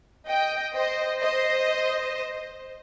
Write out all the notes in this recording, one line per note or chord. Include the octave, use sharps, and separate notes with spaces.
D#5 G5
C5 D#5
C5 D#5